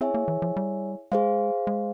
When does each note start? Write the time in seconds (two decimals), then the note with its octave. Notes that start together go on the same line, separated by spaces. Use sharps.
0.01 C4 E4 G#4 C#5 E5 G#5
0.14 A#3
0.28 E3
0.42 F3
0.57 G3
1.12 G#3 G#4 C5 F5
1.67 G#3